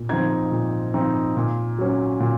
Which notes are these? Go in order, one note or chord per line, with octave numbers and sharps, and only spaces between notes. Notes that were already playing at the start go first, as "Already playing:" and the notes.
Already playing: A#2
F3 C4 D#4 G#6
A#2
F3 C4 D#4
A#2
F#3 C#4
A#2